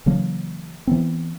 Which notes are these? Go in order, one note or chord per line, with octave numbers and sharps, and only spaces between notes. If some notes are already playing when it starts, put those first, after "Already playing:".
C#3 E3 F#3 A#3
E3 B3 C4